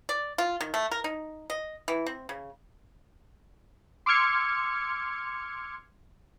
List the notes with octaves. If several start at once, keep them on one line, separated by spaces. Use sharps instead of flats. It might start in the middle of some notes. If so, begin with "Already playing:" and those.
D5
F4
D#3
A3
A#4
D#4
D#5
E3
C4
C#3
C6 D6 E6 F6 G#6 C#7